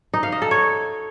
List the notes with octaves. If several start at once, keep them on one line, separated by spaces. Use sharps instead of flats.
D#4
F5
D#5
A4
C#5